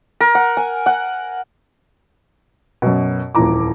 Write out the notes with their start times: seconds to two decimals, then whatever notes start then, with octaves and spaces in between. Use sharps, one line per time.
0.21 A#4
0.35 F#5
0.57 G#5
0.86 F#5
2.82 F#2 B2
3.35 D#1 F2 A#2 E3 A#5 D6